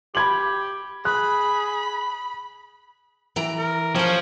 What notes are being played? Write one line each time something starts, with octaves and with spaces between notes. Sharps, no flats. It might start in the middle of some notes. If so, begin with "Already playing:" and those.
G4 B5 G#6 F#7
G#4 B5 F#6
E3 G5 A#5
A#4
F3 C#4 A#4 C5